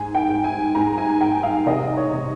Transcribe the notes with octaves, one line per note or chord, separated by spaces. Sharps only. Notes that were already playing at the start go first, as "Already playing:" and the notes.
Already playing: G#2 G#5
G5
G#2
G#5
G#2 A#5
G#5
G#2 G5
F5
C3 D#5
C#5
C3